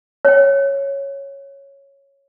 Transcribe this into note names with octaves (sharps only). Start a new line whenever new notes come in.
C#5 G5